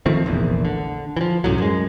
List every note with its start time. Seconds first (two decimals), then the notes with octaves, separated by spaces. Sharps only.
0.06 D#3 F3 A3 C4
0.24 F1 A#1 E2
0.65 D3
1.17 E3 F3
1.44 C2 F#2 A2 F#3
1.58 F#2 G#3